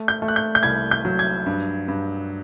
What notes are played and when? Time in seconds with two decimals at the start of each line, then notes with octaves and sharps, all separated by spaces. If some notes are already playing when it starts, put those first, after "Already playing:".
Already playing: A3
0.08 G6
0.22 A3
0.28 F#6
0.36 G6
0.55 G6
0.63 C2 G#6
0.91 G6
1.05 F#3
1.19 G#6
1.46 G2
1.88 G2